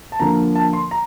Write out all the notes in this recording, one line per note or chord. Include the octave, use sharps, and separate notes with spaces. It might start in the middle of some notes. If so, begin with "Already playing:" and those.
A5
D3 F3 A#3 A#5
A5
C6
A#5